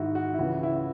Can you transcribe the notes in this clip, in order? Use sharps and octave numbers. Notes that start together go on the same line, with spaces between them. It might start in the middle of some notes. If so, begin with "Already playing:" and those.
Already playing: G#2 D#3 D#4 E4 F#4
F#4
E4
C#2 C#3 E3 F#4
E4